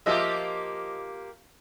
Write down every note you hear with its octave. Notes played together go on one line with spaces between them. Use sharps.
F3 A#3 F4 G4 D#5 E5